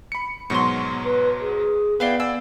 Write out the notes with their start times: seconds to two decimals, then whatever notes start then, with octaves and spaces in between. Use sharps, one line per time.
0.12 B5 C#7
0.50 G#2 B2 F#3 B3 C6 C#6
1.05 B4
1.40 G#4
2.00 B3 E4 B4 D5 F5 G5
2.20 D5 G#5 E6